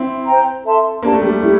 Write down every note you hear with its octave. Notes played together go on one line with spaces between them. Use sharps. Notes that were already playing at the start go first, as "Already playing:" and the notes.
Already playing: C4 E4
C5 G5 A#5
A4 E5 A5 C6
A#3 D4 G4 D5 A5
A3
G3
A3 E4 G4